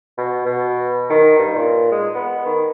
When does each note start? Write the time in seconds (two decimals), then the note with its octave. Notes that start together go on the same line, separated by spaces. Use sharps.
0.18 B2
0.46 B2
1.10 D#3
1.38 G2
1.54 A#2
1.92 G#3
2.15 B3
2.46 D#3